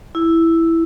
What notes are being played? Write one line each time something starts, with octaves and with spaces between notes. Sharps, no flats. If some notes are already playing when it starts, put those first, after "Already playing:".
E4